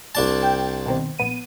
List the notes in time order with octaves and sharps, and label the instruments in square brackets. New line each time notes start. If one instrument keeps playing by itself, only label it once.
[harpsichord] C2 D4 A5
[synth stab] G5
B2 D#3 C4
A#1 B3 D#7